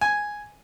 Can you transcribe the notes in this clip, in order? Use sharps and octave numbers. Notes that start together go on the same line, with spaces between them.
G#5